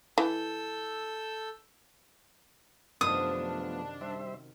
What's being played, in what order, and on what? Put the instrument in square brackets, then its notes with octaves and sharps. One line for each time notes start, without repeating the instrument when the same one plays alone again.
[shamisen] E3 [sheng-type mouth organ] A4 E6 G6
[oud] F#2 C3 D#3 [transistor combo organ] F3 A3 B3 [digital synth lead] D4 [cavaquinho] D#6
[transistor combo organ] G3 C5 E5